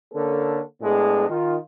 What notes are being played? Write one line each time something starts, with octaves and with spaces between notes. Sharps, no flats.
D3 A#3 C#4 A4
A2 G#3 B3 D4 G#4
D#3 F4